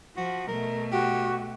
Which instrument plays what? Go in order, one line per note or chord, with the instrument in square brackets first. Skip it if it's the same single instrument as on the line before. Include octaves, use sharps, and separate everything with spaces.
[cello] F3 [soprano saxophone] F#4
[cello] B2 A3 [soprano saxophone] A#4
[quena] F#4 [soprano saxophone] G4